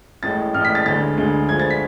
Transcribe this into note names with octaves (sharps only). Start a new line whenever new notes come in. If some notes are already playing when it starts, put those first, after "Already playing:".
A1 A2 G#3 A6
A1 A2 G#3 F6
B6
A6
D2 D3 G#3 A6
D2 D3 G#3
D2 D3 F3 G#3 G#6
A6
B6